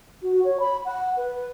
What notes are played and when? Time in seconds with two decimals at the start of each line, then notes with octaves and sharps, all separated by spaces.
0.22 F#4
0.44 C#5
0.59 B5
0.85 F#5
1.16 B4